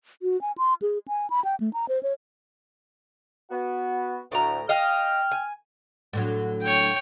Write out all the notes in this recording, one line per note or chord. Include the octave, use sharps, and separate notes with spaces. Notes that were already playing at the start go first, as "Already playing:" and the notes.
F#4
G#5
C6
G#4
G#5
B5
G5
A3
A#5
C5
C#5
B3 F#4
D2 A2 A#5
D#5 F5 G5 F6
G#5
A2 D3 F#3
C#5 G5